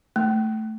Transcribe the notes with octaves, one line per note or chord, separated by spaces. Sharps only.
A3